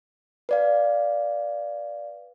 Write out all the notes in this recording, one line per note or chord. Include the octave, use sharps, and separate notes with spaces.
B4 D5 F5